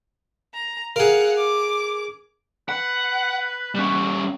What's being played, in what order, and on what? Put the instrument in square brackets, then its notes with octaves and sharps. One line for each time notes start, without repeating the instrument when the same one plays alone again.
[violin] A#5
[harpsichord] G#4 A#4 [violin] F5 F#5
[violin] D6
[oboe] B4 [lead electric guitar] F#5
[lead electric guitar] G3 C#4